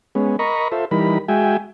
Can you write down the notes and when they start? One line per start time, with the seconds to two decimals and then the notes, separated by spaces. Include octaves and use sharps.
0.15 G#3 B3 C#4
0.39 A#4 D#5 A#5 B5 C#6
0.72 F4 A4 C5 E5
0.91 E3 G3 D#4 A#4 B5
1.28 G#3 F#4 E5 G5 G#5